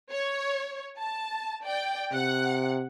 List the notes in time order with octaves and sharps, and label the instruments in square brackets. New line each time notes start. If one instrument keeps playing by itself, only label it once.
[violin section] C#5
A5
D5 G5
[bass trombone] C3 [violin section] F#5